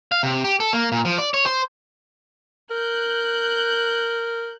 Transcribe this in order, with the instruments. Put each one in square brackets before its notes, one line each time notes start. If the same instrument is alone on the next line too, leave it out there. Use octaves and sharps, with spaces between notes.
[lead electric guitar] F5
C3
G4
A4
A#3
A#2
F3
D5
C#5
C5
[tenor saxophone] A#4 [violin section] F#6 G6